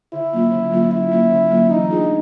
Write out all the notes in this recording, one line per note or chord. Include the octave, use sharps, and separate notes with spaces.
D3 E4
F#3 A#3 C#4 F4
D3
F#3 A#3 C#4 F4
D3 E4
F#3 A#3 C#4 F4
D3
F#3 A#3 C#4 F4
E3 D#4
A3 D4 F4 G#4